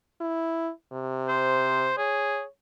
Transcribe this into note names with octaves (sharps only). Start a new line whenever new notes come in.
E4
C3
C5
G#4 C#5